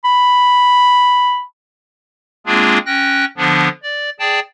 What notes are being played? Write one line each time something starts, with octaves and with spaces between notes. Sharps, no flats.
B5
G#3 A#3 C4 D4 F4 G#4
C#4 G5 F#6 A#6
D3 F3 B3 D4
D5
G#4 D5 G5 A5